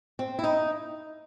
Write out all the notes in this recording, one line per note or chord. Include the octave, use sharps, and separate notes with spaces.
C4
E4
D#4